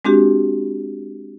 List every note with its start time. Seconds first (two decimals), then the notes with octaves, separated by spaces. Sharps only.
0.05 G#3 C4 D4 F#4 G4